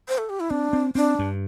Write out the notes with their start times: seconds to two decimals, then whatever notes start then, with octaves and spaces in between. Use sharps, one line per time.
0.08 C5
0.18 A4
0.30 G4
0.40 E4
0.50 C4 D4
0.73 C4
0.95 C4 D4
1.19 G2